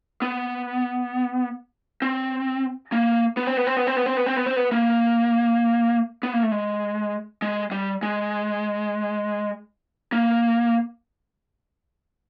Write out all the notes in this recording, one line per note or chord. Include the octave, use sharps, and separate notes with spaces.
B3
C4
A#3
B3
C4
B3
C4
B3
C4
B3
C4
B3
C4
B3
C4
B3
A#3
B3
A#3
A3
G#3
G#3
G3
G#3
A#3